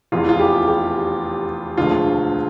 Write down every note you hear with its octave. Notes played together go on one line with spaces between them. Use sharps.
F1 E2 E3 F4
F4
G4
G4
E1 D2 D3 F3 F4